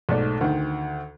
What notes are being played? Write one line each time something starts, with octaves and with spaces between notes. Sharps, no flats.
B1 G#2 A3 D5
D2 D#3